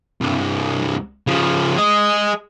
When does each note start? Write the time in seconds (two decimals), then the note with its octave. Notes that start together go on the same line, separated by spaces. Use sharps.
0.21 C2 G2
1.27 C#3 F3
1.76 G#4 D#5